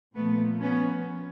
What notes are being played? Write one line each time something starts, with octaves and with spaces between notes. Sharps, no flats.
A#2 F3 A3 B3
B3 C#4